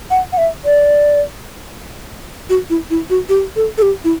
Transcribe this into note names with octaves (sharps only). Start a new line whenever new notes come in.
F#5
F#5
E5
D5
F#4
E4
E4
F#4
G4
A4
A4
G4
E4